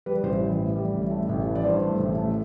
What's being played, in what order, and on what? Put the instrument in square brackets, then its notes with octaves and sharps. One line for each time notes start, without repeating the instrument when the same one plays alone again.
[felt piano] G3 B4
A1 C5
E3
A2
G3
A1
A3
A1
E3
D5
G2 C5
A3
A1
A3